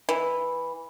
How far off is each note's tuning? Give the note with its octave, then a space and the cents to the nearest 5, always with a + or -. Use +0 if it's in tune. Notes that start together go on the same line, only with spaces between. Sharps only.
E3 -5